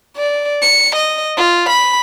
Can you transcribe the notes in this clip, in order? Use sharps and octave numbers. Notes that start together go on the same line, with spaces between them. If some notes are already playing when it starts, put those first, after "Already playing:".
D5
C#7
D#5
F4
B5